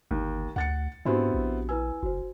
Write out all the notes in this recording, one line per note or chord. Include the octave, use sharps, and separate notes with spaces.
G1 D#2
D2 F#5 A6 C#7
G#2 B3 C4 D4 E4 F#4 G4
A#1
E4 B4 G#5 E6
F#1 F#4 C5